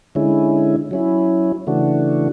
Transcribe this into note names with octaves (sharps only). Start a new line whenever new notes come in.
D3 G#3 C#4 E4
F#3 C#4 E4
C#3 E3 A3 D4 F#4